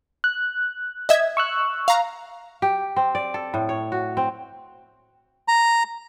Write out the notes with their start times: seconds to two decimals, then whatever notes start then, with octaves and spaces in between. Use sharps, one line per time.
0.24 F#6
1.09 D#5 E5 G#6
1.37 C#6 E6 F#6
1.88 F5 A#5
2.62 G4
2.96 C4
3.15 D5
3.34 A4
3.54 A2
3.69 C#5
3.92 F#4
4.17 C4
5.48 A#5